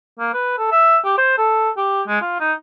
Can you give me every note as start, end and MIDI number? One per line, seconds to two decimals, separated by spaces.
0.19 0.31 58
0.34 0.54 71
0.58 0.68 69
0.71 0.98 76
1.05 1.13 67
1.18 1.34 72
1.38 1.70 69
1.77 2.02 67
2.08 2.20 56
2.22 2.35 65
2.40 2.53 63